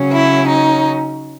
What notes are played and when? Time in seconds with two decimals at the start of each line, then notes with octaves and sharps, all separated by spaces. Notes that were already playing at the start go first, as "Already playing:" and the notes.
Already playing: C#3 F#3 C#4
0.13 E4
0.48 D#4